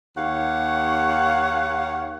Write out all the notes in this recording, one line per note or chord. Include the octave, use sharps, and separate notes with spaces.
D#2 G4 C#5 F5 F#5